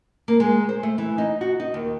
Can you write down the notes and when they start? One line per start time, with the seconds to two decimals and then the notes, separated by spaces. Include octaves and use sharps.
0.28 A#3
0.40 G#3
0.69 C5
0.83 A3
0.98 E3
1.18 D#4
1.41 F#4
1.60 D#4
1.74 D#2